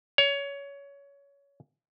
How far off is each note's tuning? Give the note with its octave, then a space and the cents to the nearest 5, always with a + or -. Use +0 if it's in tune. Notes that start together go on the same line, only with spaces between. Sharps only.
C#5 +20